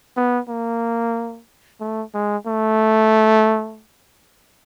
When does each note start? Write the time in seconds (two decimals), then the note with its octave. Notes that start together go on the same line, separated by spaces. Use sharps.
0.17 B3
0.49 A#3
1.80 A3
2.14 G#3
2.47 A3